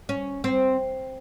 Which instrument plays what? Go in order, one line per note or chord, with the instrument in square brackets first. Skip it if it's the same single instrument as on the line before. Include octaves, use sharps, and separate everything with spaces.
[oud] C#4
C4